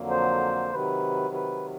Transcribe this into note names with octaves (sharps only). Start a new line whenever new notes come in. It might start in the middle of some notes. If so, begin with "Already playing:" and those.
Already playing: F2 D3 F#3 A#3
C5
C3 D#3 F#3 B4
B4